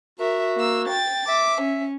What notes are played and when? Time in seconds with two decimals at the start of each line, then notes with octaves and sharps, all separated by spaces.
0.20 F#4 A#4 E5
0.57 A#3 E6
0.88 G5 A6
1.28 E5 D6
1.62 C#4